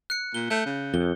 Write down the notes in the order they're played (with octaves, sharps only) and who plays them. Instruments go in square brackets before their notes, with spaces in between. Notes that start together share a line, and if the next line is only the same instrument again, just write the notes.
[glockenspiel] F#6 C#7
[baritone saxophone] A#2 [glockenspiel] G7
[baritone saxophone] A3 [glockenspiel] G6
[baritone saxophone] C#3
[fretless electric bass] F2 [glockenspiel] G7